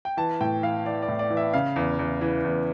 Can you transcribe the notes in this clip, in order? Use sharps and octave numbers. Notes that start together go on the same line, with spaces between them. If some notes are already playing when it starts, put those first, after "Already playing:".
G5
E3 A5
A2 G5
E3 F5
E3 D5
D5
A2
D5
E3
E5
C#3 F5
E2
E2
E3
E2